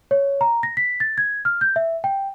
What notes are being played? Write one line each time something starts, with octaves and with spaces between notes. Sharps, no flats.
C#5
A#5
A#6
B6
A6
G#6
F6
G6
E5
G5